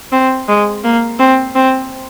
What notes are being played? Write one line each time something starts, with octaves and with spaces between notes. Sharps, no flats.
C4
G#3
A#3
C4
C4